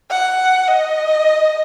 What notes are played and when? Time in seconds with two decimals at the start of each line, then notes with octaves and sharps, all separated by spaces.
0.10 F#5
0.68 D#5